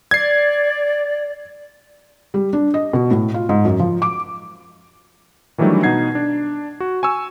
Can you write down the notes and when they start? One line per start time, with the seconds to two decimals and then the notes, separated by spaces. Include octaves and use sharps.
0.11 D5 G#6 C7
2.34 G3
2.53 D4
2.74 D#5
2.93 B2
3.11 A2
3.34 F4
3.49 G#2
3.65 F#2
3.80 F3
4.02 D6
5.58 D#3 E3 F#3 G3 A3 D4
5.83 B2 D#4 F#5 G#6 C7
6.15 D4
6.80 F#4
7.03 G#5 C#6 E6